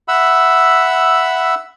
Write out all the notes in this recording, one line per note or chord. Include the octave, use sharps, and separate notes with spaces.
E5 F#5 B5 E6